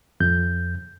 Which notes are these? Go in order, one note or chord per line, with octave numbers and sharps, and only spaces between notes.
F2 G6